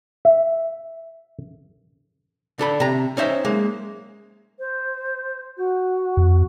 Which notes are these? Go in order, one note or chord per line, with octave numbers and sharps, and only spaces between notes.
E5
D3 A4 B5
C3 A#5
C#4 D#4 C5 E5
G#3 A#3
C5
F#4
F2